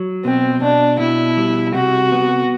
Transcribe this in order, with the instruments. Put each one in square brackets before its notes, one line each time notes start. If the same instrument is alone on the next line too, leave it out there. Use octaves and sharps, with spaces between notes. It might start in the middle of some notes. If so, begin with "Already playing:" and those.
Already playing: [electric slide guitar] F#3
[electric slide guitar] B2 [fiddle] C4
[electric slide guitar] B2 [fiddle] D4
[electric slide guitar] B2 [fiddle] E4
[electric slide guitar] G3
[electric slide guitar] C3 [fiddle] F#4
[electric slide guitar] B3